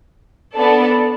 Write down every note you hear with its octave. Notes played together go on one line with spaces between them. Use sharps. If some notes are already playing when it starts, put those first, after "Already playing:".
B3 D4 A4 D5 A5